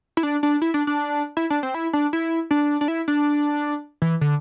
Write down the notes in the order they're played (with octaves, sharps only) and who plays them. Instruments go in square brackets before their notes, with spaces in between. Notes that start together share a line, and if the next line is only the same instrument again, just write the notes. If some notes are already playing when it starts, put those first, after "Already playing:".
[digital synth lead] E4
D4
D4
E4
D4
D4
E4
D4
C4
E4
D4
E4
D4
D4
E4
D4
E3
D3